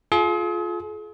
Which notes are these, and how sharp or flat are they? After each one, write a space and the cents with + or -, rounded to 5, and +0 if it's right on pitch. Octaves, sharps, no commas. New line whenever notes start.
F4 +0 G#4 +40